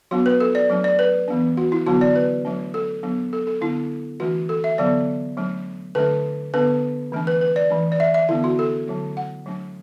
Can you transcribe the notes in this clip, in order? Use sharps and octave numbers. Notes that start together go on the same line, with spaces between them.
F#3 B3 D4 F#4
B4
A4
D5
F#3 A3 D4
D5
B4
E3 B3 D4
F#4
E4
D3 F#3 B3 D4 F#4
D5
B4
F#3 A3 D4
A4
F#3 B3 D4
A4
A4
D3 B3 D4 E4
E3 A3 D4 F#4
A4
E5
D3 F#3 B3 D5
F#3 A3 D4
D3 A3 D4 B4
D3 B3 D4 B4
E3 A3 D4
B4
B4
D5
E3 A3 D4
D5
E5
E5
D3 B3 D4 E4
F#4
A4
D3 F#3 A3
F#5
F#3 A3 D4